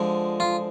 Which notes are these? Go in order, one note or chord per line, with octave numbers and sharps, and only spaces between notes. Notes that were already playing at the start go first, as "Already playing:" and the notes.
Already playing: D3 F3 G#3
F4